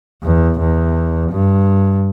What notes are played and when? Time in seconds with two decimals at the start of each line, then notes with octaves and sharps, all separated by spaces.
0.23 E2
0.59 E2
1.31 G2